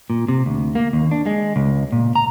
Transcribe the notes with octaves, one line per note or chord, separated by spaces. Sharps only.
A#2
C3
D2
A#3
D#2
D4
G#3
C#2
A#2
A#5